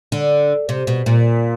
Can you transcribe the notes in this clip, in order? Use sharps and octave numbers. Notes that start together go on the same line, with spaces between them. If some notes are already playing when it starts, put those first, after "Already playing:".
D3
C3
B2
A#2